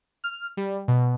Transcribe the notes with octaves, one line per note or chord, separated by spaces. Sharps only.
F6
G3
B2